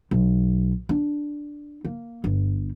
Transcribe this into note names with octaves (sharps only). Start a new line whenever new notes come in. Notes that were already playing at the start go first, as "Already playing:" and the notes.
B1
D4
A#3
G1